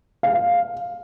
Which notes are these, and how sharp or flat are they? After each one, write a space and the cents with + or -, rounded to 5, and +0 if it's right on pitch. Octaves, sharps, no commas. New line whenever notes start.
F5 +5